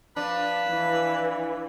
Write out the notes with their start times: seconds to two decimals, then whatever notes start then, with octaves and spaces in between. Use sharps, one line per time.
0.16 F3 D4 B4
0.68 E3